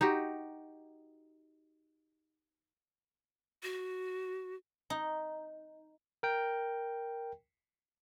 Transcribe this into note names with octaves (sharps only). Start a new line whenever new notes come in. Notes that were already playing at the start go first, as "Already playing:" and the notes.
D#4 F#4 G4
F#4
D#4
A#4 G5